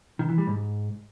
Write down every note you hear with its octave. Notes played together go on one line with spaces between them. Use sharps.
D#3
E3
G3
G#2